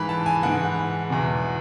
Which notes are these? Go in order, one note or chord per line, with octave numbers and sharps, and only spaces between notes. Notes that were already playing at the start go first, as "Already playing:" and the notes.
Already playing: G#2 E3 B5
A5
G#5
G#2 E3 F#5
E2 B2